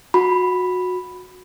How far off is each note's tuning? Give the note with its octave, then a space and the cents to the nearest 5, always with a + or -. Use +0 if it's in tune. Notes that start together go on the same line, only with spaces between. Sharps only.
F#4 -20 B5 +0